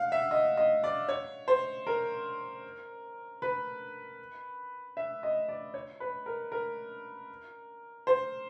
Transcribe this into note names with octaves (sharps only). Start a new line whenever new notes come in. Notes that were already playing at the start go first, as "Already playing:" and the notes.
Already playing: F5 F#5
E5
D#5
D#5
D5
C#5
C5
A#4
B4
E5
D#5
D5
C#5
B4
A#4
A#4
C5